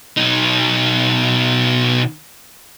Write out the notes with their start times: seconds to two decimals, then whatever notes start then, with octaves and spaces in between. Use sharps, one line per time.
0.17 B2 D#4